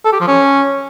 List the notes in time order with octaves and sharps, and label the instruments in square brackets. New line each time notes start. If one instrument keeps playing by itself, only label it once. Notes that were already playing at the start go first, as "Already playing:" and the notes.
[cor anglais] A4
G4
F3
C#4